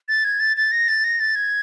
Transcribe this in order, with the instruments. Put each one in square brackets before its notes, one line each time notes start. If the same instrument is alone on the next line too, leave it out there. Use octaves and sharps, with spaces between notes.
[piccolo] A6
G#6
A6
A6
A#6
A6
A#6
A6
G#6